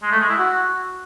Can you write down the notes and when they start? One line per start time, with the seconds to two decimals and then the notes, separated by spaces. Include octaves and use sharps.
0.03 G#3
0.11 A3
0.20 G#3
0.29 E4
0.38 F#4